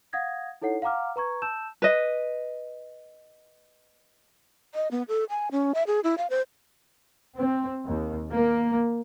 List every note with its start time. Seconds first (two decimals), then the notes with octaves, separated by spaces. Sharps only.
0.13 F5 F#5 D#6 G#6 A#6
0.61 D#4 E4 A4 C#5 F#5 C7
0.82 F5 F#5 A#5 D6 F6
1.16 B4 A#5 C#6 G#6
1.42 A5 E6 G6 E7
1.82 B4 D#5
4.75 D#5
4.91 B3
5.08 A4
5.30 G#5
5.51 C#4
5.75 E5
5.87 G#4
6.04 E4
6.18 F5
6.30 C5
7.36 C4
7.86 D#2
8.31 A#3